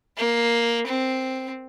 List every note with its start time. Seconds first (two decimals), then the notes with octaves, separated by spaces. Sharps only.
0.17 A#3
0.87 C4